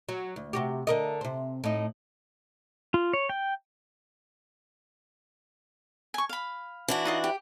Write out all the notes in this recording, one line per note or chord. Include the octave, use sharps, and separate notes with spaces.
F#3
D2
C3 F#4 G4
D3 A#4 D#5
C3 C4
A2 D#4
F4
C#5
G5
G#5 C#6
F5 B5
E3 D4 F#4
D#4 F4 D#5
G4